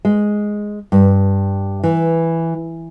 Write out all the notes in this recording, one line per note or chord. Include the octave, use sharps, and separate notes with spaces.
G#3
G2
E3